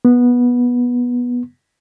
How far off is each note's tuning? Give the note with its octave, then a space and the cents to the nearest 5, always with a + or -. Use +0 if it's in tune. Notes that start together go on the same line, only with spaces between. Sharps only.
B3 -15